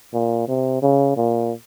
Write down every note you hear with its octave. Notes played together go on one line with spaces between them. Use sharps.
A#2
C3
C#3
A#2